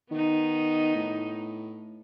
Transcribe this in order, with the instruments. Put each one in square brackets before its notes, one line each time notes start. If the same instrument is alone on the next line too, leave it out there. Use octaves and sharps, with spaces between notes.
[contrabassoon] D#3 [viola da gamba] B3 D#4
[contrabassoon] A2